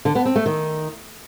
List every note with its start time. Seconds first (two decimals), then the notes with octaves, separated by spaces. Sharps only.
0.05 D3
0.15 B3
0.25 C4
0.36 A3
0.46 D#3